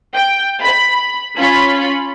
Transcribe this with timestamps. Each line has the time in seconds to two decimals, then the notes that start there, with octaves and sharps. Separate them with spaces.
0.14 G5
0.61 B5
1.38 C#4 F4 B5